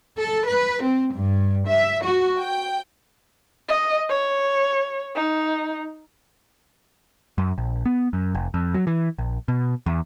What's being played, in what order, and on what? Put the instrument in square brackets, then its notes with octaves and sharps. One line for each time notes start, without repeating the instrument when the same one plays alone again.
[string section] A4
B4
C4
G2
E5
F#4
G5
[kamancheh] D#5
C#5
D#4
[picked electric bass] F#2
A#1
B3
F#2
F1
F2
F#3
E3
A#1
B2
E2